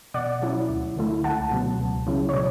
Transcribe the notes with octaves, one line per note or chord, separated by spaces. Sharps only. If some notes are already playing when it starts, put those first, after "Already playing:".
B2 D5 F#5
F#3 C#4 E4
D2
D3 A3 E4
C#2 F#5 A5
B2 F#3 B3
C#2
C#3 F#3 C#4 E4
C#5
B2 D5